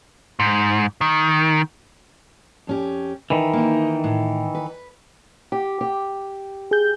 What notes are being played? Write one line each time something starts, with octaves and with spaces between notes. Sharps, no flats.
G#2
D#3
F2 C#4 G4
D#3 E3 B4
A#3 D#4
A2
B4
G4
G4
G#4 G6